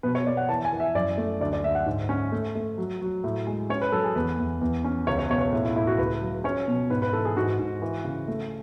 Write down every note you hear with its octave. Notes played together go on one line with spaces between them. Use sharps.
B2 B4
C#5
B3 D5
F#5
E3 A5
G#5
E3
E5
F#2 D5
A3
D2 D5
D5
D2 E5
F#5
G#2
C#4
A3
A3
F#3
F#3
A2
G#3
C#4 C#5
B4
F#3 A4
G#4
E2 B4
E2
E2
C#4
C#2 C#5
C#5
B2 C#5
C#5
A2
E4
A2 E4
F#4
C#2 B4
F#3
C#4 C#5
B2
G#2 B4
B4
E3 A4
G#4
G#2 F#4
G#2
E3
C#3
A3